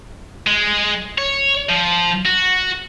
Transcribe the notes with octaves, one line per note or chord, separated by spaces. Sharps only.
G#3
C#5
F3
F#4